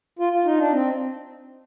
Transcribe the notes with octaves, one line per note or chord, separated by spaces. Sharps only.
F4
F4
D#4
D4
C4